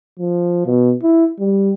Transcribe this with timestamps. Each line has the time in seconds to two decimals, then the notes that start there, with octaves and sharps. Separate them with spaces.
0.19 F3
0.66 B2
1.03 E4
1.39 G3